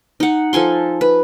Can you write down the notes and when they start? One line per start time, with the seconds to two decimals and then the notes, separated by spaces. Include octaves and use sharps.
0.20 D#4 F#5
0.53 F3 A4 G#5 C6
1.01 B4